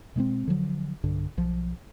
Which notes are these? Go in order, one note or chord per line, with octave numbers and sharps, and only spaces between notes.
B2 G#3 A#3 C4
D3 F3 F#3
B1 G2 D3
B1 F3